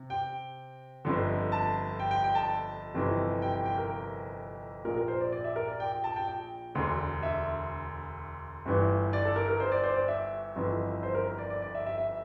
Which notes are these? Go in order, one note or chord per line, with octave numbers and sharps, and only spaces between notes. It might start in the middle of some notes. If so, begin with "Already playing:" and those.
Already playing: C3
G5
G1 F2 D3
A5
G5
G5
G5
A5
G1 F2 C3 E3
G5
G5
G5
A#4
A#1 A#2 A#4
A#4
C5
D5
D5
E5
A#4
D5
G5
G5
A5
G5
G5
E1 D2 D3
E5
G1 G2 E3
D5
A4
A#4
A#4
C5
D5
C5
D5
E5
G1 F2 E3
C5
A#4
D5
D5
D5
E5
E5
E5